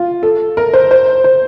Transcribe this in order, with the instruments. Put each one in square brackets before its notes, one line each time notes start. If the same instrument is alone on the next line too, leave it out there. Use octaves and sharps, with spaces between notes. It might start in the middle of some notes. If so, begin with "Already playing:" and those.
Already playing: [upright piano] F4
A4
A#4
C5
C5
C5